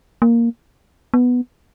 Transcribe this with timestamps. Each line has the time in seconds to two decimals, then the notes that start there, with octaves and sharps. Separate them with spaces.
0.22 A#3
1.14 B3